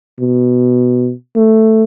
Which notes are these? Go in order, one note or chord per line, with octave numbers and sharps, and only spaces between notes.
B2
A3